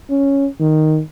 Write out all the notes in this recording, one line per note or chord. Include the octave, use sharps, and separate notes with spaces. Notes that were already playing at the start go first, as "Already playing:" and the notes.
C#4
D#3